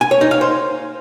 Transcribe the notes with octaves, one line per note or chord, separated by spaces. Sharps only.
G#5
C#5
D#4
F5
C5